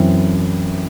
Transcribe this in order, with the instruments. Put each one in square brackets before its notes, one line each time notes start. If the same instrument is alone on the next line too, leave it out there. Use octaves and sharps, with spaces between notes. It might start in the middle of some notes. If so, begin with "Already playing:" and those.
Already playing: [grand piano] F#2 E3 C4